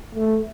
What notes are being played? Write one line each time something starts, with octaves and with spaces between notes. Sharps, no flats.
A3